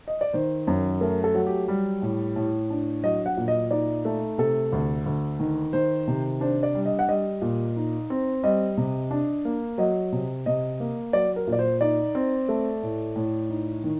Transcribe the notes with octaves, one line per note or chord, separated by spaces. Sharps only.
D#5
D5
D#3 C5
F#2
A3 A#4
A4
F#3
G4
G3
A2
A2
D4
F#3 D#5
F#5
A#2
D#5
D#4 D5
A3
C3 A4
D2
D2
D#3
D#3 C5
C3
D4 C5
D5
G3
D#5
F#5
G3 D#5
A#2
D#4
C4
G3 D#5
C3
D4
A#3
F#3 D#5
C3
C3 D#5
A#3
F#3 D5
A#4
A#2 D5
C5
D#4 D5
C4
A3
A2
A2
D#4
D#3